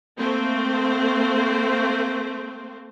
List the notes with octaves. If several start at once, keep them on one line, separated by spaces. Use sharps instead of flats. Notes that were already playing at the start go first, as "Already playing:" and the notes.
A3 A#3 C4 C5